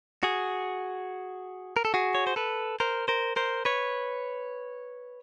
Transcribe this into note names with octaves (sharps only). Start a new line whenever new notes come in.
F#4 G#4
A#4
A4
F#4 G#4
C#5
C5
A4 B4
A#4 C5
A#4 C5
A#4 C5
B4 C#5